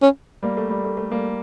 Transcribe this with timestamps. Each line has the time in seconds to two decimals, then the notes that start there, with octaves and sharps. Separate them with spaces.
0.02 C#4
0.43 G3 A#3
0.57 A3
0.70 G3
0.84 A3
0.97 A3
1.11 G3 A#3